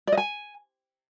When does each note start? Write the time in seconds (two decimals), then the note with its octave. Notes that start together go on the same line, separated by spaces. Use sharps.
0.07 D5
0.12 D#5
0.17 G#5